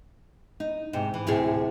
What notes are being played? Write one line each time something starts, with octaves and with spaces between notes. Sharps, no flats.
D#4
G#2 C3 D#4
E3
D2 A2 C3 G#4